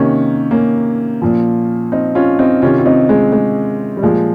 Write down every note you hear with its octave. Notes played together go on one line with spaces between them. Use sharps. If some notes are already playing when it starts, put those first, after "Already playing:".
Already playing: C3 D#3 A#3 C#4
A#3 C#4
A#2 F3
C4 D#4
C#4 F4
C4 D#4
C3 D#3 C#4 F4
F4
C4 D#4
G#3
G#3
G3
A#2 F3 G#3